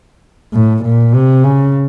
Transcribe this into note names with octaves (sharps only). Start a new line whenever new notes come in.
A2
A#2
C3
C#3